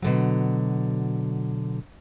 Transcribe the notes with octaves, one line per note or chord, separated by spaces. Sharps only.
B2 D3 F#3